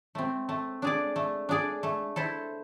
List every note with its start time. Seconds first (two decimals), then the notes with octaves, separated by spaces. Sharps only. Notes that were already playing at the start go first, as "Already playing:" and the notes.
0.15 A3 C4
0.49 A3
0.82 D4 G#4 D5
1.16 A3
1.49 D4 G#4 D5
1.83 A3
2.16 E4 A4 C5